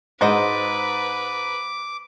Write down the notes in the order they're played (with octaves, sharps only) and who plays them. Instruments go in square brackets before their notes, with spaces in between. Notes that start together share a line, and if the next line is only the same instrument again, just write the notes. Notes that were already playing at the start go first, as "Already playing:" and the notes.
[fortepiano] G#2 [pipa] F#4 C5 D#5 [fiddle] B4 [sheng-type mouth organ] D6